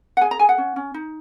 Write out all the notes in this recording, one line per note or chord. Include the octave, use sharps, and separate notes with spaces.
F#5
G#4 G#5
A#5
G#4 G#5
F#5
C#4
C#4
D#4